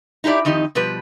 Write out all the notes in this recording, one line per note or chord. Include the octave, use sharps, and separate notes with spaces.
D#4 E4 G4 A4 D5
F2 D#3 D#4 G4 D#5
B2 F3 G3 B4